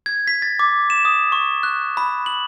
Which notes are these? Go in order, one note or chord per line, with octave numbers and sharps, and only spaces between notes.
G#6
B6
A6
D6
E7
D#6
C#6
F#6
B5
F#7